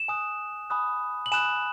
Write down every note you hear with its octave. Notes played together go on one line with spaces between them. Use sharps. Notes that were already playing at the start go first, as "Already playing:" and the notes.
Already playing: E7
G#5 D#6 F#6
G#5 B5 D#6 F#6
F#7
G#5 B5 D#6 F#6 E7